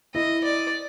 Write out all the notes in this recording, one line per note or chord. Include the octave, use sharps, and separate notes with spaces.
E4 D#5
D5